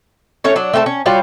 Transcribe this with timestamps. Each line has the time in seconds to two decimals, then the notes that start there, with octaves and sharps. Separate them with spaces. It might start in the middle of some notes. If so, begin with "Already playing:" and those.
0.44 A3 C#4 C#5
0.56 F#3 D4
0.74 A3 C4 F4 A4
0.86 C#4
1.06 G3 F4 F#4 C#5